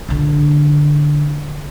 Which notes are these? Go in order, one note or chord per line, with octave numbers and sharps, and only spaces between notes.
A#1 D3